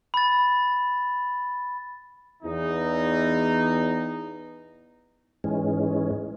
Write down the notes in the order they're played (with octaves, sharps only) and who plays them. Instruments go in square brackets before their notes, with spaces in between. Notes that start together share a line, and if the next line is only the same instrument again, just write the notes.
[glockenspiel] B5 A6
[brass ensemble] E2 D#4
[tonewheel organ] G#2 E3 G#3 C#4